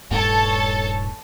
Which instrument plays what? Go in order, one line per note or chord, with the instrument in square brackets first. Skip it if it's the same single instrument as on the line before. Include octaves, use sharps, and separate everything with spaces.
[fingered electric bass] D#1 G2 A3 [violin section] A4 C#5 A5